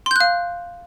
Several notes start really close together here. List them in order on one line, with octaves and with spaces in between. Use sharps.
C6 G6 F#6 F5